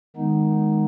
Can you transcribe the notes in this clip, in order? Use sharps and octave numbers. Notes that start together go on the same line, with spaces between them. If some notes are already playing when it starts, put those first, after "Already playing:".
D#3 G#3 B3 D#4